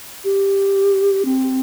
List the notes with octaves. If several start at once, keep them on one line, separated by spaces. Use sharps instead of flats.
G4
C4